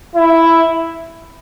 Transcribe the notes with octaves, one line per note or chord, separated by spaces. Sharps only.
E4